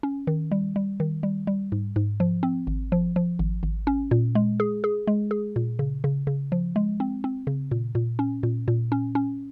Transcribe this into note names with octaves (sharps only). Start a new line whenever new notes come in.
C#4
D#3
G3
G3
D#3
G3
G3
G#2
G#2
F3
C4
G#1
F3
F3
G#1
G#1
C#4
A#2
G#3
G#4
G#4
G#3
G#4
A#2
C#3
C#3
C#3
F3
G#3
C4
C4
C#3
A#2
A#2
C#4
A#2
A#2
C#4
C#4